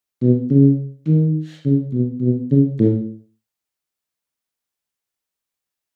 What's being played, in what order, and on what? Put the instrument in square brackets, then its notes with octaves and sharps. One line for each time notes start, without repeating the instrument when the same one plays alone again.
[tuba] B2
C#3
D#3
C#3
B2
B2
C#3
A2